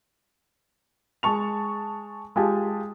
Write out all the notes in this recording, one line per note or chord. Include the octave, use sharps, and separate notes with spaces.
G#3 A5 C#6 F7
G#3 F4 G4 G#5 A5